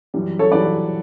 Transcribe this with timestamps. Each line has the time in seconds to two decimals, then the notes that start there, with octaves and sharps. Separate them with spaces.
0.14 F#2 E3 G3
0.39 A4 C#5
0.52 F#2 E3 G3 B4 D5